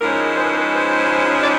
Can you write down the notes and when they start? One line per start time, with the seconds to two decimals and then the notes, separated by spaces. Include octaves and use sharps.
0.01 G#2 F3 G#3 C#4 E4 A#4
0.37 C5
0.44 B4
0.51 A#4
0.59 B4
0.74 C5
1.42 D5